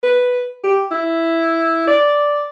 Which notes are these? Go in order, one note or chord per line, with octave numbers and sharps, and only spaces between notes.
B4
G4
E4
D5